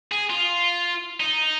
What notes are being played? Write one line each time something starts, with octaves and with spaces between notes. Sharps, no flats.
G#4
F4
D#4